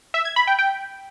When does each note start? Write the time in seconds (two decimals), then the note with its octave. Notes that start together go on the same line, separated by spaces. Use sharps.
0.14 E5
0.25 G#6
0.36 B5
0.47 G5
0.59 G5